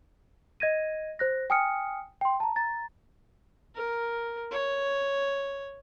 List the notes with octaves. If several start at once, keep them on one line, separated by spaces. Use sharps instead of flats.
D#5 G#6 A#6 D#7
C5 F#6 A#6
G5 G#5 D#6 F6 C#7
G5 C6
A5 A#5
A#5 A6
A#4
C#5